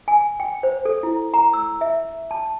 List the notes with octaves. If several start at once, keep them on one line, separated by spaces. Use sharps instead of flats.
G#5
G5
C5
A4
E4
A#5
E6
E5
A5